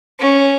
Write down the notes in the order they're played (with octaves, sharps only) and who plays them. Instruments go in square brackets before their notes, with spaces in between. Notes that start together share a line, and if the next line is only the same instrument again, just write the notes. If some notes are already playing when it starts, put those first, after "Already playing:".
[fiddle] C#4